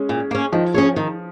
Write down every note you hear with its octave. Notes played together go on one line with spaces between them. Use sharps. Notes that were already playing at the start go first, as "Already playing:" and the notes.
Already playing: G#3 C#4
A#2
A#3 C#4
D#3 F3
C#4 G#4 C#5
D#3